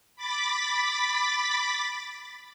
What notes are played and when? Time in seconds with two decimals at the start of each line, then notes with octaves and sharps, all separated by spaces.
0.16 B5 D6 A6 B6